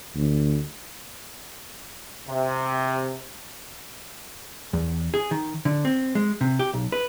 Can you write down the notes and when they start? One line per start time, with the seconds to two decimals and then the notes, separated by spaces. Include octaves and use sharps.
0.15 D2
2.28 C3
4.73 E2
5.14 G#4
5.31 D#3
5.65 D3
5.85 C4
6.15 G#3
6.41 C3
6.59 G4
6.74 B1
6.92 B4